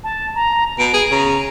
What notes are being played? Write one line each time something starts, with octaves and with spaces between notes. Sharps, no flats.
A5
A#5
B2 D7
G#4
C#3 A#5